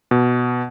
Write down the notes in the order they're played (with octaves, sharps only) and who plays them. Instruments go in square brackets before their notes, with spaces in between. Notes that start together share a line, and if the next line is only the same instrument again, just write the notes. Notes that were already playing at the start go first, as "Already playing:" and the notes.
[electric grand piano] B2